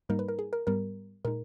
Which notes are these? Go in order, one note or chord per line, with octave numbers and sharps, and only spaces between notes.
G#2 G3 A#3 D#4 A#4
B4
A#4
G#4
A#4
G#2 G3 B3 A#4
A#2 G#3 D#4 A#4